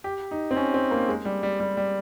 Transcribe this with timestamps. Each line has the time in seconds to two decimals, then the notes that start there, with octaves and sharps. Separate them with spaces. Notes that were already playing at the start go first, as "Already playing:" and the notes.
0.04 G4
0.31 D#4
0.51 C4
0.56 C#4
0.74 C4
0.91 A#3
1.08 G#3
1.25 G3
1.43 G3
1.60 G3
1.77 G3